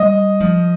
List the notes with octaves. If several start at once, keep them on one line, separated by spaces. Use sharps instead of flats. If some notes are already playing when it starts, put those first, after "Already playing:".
Already playing: G3 D#5
F3